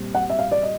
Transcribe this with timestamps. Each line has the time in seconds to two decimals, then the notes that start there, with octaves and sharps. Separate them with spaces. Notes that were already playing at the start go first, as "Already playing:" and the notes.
Already playing: A#2 G3 C4
0.15 F#5
0.29 E5
0.39 F5
0.52 D5
0.63 D#5